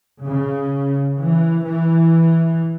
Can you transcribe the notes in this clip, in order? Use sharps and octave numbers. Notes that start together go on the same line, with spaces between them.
C#3
E3
E3